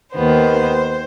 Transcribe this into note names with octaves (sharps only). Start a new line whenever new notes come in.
D#2 D#3 B3 C5